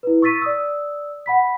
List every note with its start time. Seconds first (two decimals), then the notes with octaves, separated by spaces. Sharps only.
0.03 E4 B4
0.22 C#6 E6 A6 B6 D#7
0.42 D5 D#6 E6
1.26 F#5 B5 B6